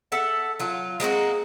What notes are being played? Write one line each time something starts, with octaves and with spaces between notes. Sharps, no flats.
A4 E5 F#5
F#3 F4
G#3 A#3 C4 F#4